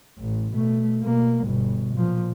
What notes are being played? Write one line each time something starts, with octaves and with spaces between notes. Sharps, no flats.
A1
B2 A3
B2 A#3
G1 B2
A#2 F3